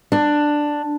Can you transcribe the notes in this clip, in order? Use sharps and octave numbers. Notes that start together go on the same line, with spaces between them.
D4